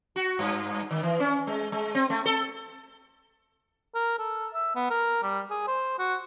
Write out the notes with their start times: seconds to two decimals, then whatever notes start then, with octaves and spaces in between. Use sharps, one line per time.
0.16 F#4
0.39 G2
0.91 D#3
1.03 E3
1.20 C#4
1.47 G#3
1.72 G#3
1.95 C4
2.10 A3
2.26 A4
3.95 A#4
4.19 A4
4.54 E5
4.75 B3
4.91 A#4
5.23 G3
5.50 G#4
5.68 C5
5.99 F#4